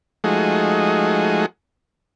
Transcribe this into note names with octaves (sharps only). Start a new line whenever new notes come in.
F3 G#3 A3 D#4 F#4 G#4